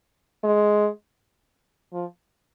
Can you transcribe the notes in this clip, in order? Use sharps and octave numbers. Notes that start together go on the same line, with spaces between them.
G#3
F3